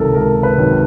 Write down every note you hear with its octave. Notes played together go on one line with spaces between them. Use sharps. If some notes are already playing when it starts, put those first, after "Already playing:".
Already playing: C#2 C3 D#3 F#3 A4 A#4
C#2 A#4
B4
C3 D#3 F#3